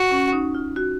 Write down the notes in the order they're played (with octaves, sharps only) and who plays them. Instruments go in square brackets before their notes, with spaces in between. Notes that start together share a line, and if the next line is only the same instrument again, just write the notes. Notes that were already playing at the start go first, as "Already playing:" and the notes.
Already playing: [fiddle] F#4
[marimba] C#4
D#4
F4
F#4